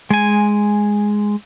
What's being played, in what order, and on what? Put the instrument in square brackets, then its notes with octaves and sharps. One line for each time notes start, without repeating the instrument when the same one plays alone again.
[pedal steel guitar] G#3 G#5